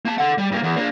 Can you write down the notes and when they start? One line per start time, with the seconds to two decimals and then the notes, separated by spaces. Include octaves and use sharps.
0.05 A#3 A5
0.18 A4 F#5
0.38 G3
0.52 G2 A#3
0.63 E2
0.76 A#3 D4